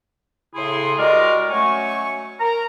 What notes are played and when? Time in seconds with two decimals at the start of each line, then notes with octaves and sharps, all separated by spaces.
0.55 A2 C#3 E4 G#4 C6
0.98 G3 G#3 F#4 A#4 D5 D#5
1.50 F#3 A3 C#4 G#5 C#6
2.40 A#4 A#5